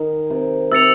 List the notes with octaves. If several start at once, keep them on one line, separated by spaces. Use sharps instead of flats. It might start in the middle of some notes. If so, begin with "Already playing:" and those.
Already playing: D#3
C3
C3 E6 A6 C#7 F7